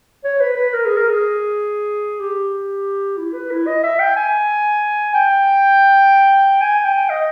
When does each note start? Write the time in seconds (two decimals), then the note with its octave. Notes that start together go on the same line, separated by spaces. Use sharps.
0.24 C#5
0.40 B4
0.56 B4
0.73 A#4
0.85 G#4
0.97 A#4
1.10 G#4
2.20 G4
3.17 E4
3.33 B4
3.51 E4
3.67 D#5
3.83 E5
3.99 G5
4.16 G#5
5.14 G5
6.61 G#5
6.85 G5
7.10 D#5